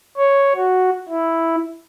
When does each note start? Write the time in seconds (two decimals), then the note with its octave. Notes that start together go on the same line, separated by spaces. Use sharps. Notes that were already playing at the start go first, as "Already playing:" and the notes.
0.17 C#5
0.55 F#4
1.09 E4